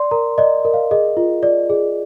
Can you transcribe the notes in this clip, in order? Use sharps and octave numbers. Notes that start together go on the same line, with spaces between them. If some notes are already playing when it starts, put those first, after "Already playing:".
Already playing: D5 C6
A#4 A#5
D5 D#5
A#4
F5
G#4 D#5
F4
D5
G#4